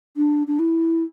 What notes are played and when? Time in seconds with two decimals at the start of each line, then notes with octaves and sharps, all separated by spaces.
0.17 D4
0.47 D4
0.59 E4